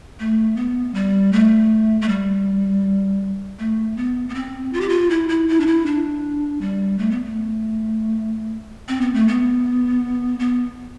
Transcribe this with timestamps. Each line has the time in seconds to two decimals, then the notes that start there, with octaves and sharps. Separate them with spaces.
0.19 A3
0.56 B3
0.94 G3
1.33 A3
2.01 A3
2.09 G3
3.59 A3
3.97 B3
4.29 B3
4.35 C4
4.73 F4
4.81 G4
4.89 F4
5.10 E4
5.29 E4
5.48 E4
5.60 D4
5.67 E4
5.86 D4
6.61 G3
6.98 A3
7.11 B3
7.25 A3
8.88 C4
9.01 B3
9.14 A3
9.28 B3
10.39 B3